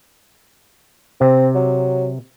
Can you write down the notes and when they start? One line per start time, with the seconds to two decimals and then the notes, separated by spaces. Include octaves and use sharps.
1.21 C3 C4
1.55 F#3